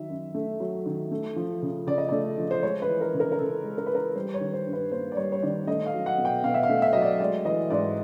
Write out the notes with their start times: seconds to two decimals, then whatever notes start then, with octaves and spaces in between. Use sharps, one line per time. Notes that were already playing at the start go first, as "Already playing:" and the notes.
Already playing: D#3 F#3 E5
0.09 F#2
0.35 A3
0.60 F#3
0.86 D#3
1.11 A3
1.36 F3
1.62 C#3
1.86 C#3 D5
1.98 D#5
2.09 A3 D5
2.38 F3
2.51 C5
2.63 G#3 C#5
2.82 B4
2.89 E3
3.01 A#4
3.14 C#3
3.20 A#4
3.32 A#4
3.39 C#3 A4
3.64 G#3
3.78 A#4
3.86 E3 B4
3.95 A#4
4.16 G3 C5
4.34 C#5
4.41 D#3
4.54 C5
4.67 G2
4.73 B4
4.92 A#3 C5
5.12 D5
5.17 G3 C#5
5.32 C#5
5.43 D#3 D5
5.67 A3 D#5
5.86 F5
5.94 F#3
6.06 F#5
6.18 B2
6.25 G5
6.44 B2 F5
6.54 E5
6.63 F5
6.69 A3
6.82 E5
6.93 F#3 D#5
7.02 D5
7.20 G#3 D5
7.45 E3 D#5
7.70 G#2 D5